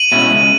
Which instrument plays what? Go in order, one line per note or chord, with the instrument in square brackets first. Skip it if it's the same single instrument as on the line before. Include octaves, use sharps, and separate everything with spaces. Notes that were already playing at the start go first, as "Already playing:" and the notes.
Already playing: [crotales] D#7 F#7
[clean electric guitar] B2 G#3 C#4 E4
C#2